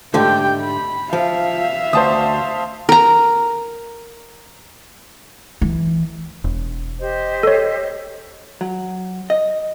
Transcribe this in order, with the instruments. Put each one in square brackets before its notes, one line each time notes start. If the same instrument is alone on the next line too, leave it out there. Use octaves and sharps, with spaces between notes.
[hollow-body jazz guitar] G#2 D3 A3 [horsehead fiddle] G4 G5
[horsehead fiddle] B5
[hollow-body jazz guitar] F3 [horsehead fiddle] E5 F5
[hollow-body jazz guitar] D2 [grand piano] C5 A5 D#6
[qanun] A#4 A#5
[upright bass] E3
[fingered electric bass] E1
[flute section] G4 C5 D#5
[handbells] A4 C#5
[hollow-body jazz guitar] F#3
D#5